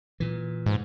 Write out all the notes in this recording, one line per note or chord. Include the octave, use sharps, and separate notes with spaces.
A#2 E3
G#2